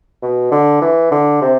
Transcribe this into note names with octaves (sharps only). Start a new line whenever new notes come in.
B2
D3
E3
D3
C3